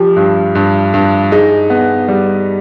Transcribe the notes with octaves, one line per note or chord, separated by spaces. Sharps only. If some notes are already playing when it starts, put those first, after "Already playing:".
Already playing: F3 G4
G2
G2
G2
D#4 G#4
B3
G3